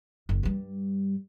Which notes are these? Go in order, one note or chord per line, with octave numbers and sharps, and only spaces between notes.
F#1
G2 G3